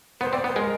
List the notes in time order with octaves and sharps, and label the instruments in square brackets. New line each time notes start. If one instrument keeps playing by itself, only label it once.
[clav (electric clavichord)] B3 [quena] C5
[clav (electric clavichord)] C4 [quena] D5
[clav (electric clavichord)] B3 [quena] C5
[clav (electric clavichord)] G#3 [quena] A#4